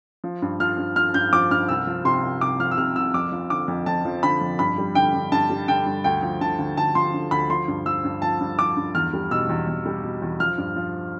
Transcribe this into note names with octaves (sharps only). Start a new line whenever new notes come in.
F3
G2
F3 F6
G2
F3 F6
G2 G6
F3 D6
G2 F6
C2 E6
F3
C3 C6
C2
C2 D6
F3 F6
E6
C3 F6
C2 E6
F2 D6
F3
D3 D6
F2
F2 A5
F3
D3 B5
F2
G2 B5
G3
D3 G5
G2
G2 A5
G3
D3 G5
G2
D2 G5
F3
D3 A5
D2
D2 A5
F3 C6
D3
D2 B5
F3 C6
G2
F3 E6
G2
F3 A5
G2
F3 D6
G2
E2 F6
G3
B2 E6
E2
E2
G3
B2
E2
F3 F6
G2
F3